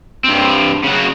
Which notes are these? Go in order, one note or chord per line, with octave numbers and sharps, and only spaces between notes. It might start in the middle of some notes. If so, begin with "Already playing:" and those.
G2 C4
C#3 F#4